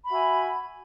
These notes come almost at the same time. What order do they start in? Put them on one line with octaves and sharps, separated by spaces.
B5 E5 F#4 G#5